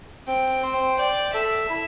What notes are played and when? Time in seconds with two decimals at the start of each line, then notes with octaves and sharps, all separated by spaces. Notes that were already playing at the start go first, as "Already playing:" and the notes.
0.27 C4 G5
0.63 C5
0.98 D5 G5
1.34 A4 E5
1.69 E4